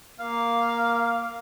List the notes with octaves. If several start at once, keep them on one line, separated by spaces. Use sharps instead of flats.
A#3 F5